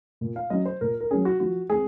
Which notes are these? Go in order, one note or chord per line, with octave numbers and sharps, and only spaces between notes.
A#2
F5
F#3 C#4 D#5
C5
A#2 A#4
A#4
F#3 C#4 G#4
F#4
F3 F#4
G#3 C4 G#4